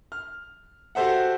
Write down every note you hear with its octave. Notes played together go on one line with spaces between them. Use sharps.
F6
F#4 G4 A4 C5 E5 F#5